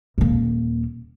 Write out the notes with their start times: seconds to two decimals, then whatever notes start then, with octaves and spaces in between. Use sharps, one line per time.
0.18 D#1 A#3